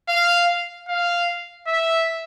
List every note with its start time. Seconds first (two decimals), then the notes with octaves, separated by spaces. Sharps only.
0.09 F5
0.89 F5
1.67 E5